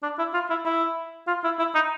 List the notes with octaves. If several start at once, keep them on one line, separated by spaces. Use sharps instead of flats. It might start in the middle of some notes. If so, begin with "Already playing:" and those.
D4
E4
F4
E4
E4
F4
E4
E4
D#4